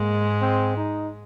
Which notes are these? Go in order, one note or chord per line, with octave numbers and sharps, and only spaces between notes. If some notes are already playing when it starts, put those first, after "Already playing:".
Already playing: G#2 G#3 A#3
C4
D#4